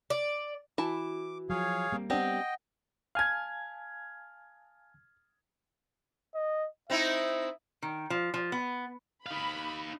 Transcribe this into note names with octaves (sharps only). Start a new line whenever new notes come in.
D5
E3 E4 F#4 A5 D6
F3 F#3 G#4 C#5 F5
G3 A#3 C4
G3 B3 C4 D4 G4 D#5 F#5 G5
F5 G#5 A5 F6 G#6
D#5
C4 D#4 E4 E5
D#3
F3
F3
B3
D#4 F5 B5